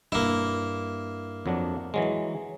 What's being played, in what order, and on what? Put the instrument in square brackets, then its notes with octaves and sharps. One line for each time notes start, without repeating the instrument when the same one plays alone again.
[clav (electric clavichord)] G2 [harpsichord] A#3 E4
[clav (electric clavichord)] F2 F#3 D4
E3 F#3 G#3